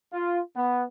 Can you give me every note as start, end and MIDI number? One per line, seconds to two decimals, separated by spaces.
0.12 0.40 65
0.56 0.84 59